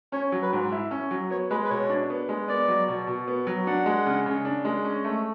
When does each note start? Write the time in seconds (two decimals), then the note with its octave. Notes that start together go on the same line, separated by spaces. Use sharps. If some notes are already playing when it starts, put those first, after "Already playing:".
0.12 C#4 C#5
0.32 F#3
0.42 B4
0.53 G#2
0.72 E4
0.91 C#4
1.11 F#3
1.30 B3 C#5
1.50 G#3 B4
1.65 B4
1.70 B2 C#5
1.90 D4
2.10 B3
2.29 G#3
2.48 B3 D5
2.68 F#3
2.88 B2
3.07 B2
3.28 B3
3.47 F#3
3.67 D4 F#5
3.86 G#3
4.06 C#3
4.26 C#3
4.45 D4
4.65 G#3
4.84 C#4
5.04 A3